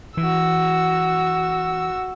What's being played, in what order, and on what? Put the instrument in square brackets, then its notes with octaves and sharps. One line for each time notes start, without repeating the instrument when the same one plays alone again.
[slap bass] E3 [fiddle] F#4 E6